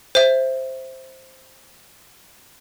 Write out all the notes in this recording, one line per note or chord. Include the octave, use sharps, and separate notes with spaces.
C5 E5